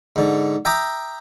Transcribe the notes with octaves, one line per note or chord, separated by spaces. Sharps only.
G#2 D3
E5 G5 A#5 D6 D#6